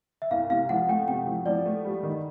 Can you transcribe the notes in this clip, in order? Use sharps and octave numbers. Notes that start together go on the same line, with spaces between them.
E5
C2 F5
C3 F5
F3 F#5
A3 G5
C3 G5
F3
F3 D5
A3
G3
D#3